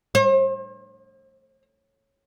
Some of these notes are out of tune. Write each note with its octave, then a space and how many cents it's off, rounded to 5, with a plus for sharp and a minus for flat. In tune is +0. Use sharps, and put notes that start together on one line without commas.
C5 +40